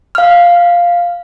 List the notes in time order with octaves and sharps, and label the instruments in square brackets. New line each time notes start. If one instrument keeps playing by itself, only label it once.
[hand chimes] F5 F6